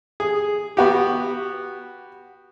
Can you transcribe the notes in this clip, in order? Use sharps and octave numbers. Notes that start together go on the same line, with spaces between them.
G#4
B3 F#4 G4